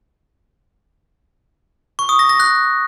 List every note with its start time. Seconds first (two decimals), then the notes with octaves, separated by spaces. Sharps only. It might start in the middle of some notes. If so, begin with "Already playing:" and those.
1.99 C#6
2.09 D#6
2.19 A#6
2.29 A#6
2.40 F#6